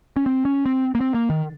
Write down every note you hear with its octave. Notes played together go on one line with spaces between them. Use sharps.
C#4
C4
C#4
C4
A#3
C4
A#3
D#3